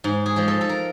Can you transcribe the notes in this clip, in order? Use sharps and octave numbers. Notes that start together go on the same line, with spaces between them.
G#2
G#4
F3 G#3
A4
A4
A#4